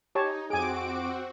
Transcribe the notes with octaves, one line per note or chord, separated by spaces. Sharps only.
D#4 G4 C#5 A5
F2 C4 F#4 G#4 G#5 D6 D7